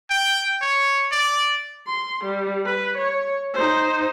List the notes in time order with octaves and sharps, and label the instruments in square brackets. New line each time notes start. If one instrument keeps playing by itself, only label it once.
[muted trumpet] G5
C#5
D5
[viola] C6
G3
B4
C#5
D#4 C5